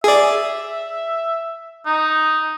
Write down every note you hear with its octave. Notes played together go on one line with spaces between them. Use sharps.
G#4 D5 E5
D#4